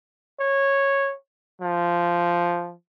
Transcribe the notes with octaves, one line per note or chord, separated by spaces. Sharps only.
C#5
F3